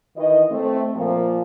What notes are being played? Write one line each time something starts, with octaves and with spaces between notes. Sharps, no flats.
D#3 E3 E4 D#5
A3 C4
A#2 F3 A#3